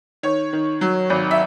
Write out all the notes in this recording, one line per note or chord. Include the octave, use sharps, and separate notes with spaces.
D#3 C#5
D#3
F#3
G#1
E5